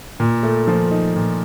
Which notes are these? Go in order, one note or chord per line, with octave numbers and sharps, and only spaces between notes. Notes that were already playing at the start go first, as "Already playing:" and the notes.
A#2
A3
F3
D#4
A#2